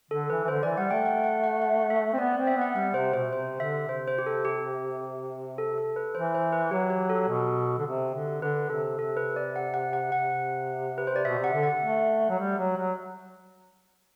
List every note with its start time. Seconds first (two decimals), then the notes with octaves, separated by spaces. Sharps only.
0.11 D3 A4
0.30 E3 B4
0.44 E3
0.48 D3 C5
0.63 E3 D5
0.77 G3 F#5
0.91 A3 G5
1.05 F#5
1.24 F#5
1.44 F#5
1.62 F#5
1.90 E5
2.13 C4
2.18 B3 D5
2.32 C4 D5
2.47 E5
2.56 B3
2.62 F#5
2.75 G3 F#5
2.94 C3 C5
3.14 B2 C5
3.32 C3 C5
3.60 D3 E5
3.88 C3 C5
4.08 C5
4.18 G4
4.26 A4
4.45 G4
5.58 A4
5.78 A4
5.96 B4
6.15 E3 C5
6.35 C5
6.52 B4
6.71 F#3 G4
6.90 G4
7.09 A4
7.28 B2
7.78 D3
7.85 C3
8.14 D3
8.41 D3 B4
8.70 C3 A4
8.98 C3 A4
9.17 B4
9.36 D5
9.56 F#5
9.74 F#5
9.93 F#5
10.11 C3 F#5
10.98 B4
11.07 C5
11.16 D5
11.25 B2 E5
11.39 C3
11.44 F#5
11.53 D3
11.63 F#5
11.82 A3
12.29 F#3
12.38 G3
12.58 F#3
12.77 F#3